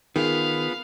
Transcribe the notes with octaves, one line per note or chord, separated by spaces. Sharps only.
D#3 B3 F4 G#4 F5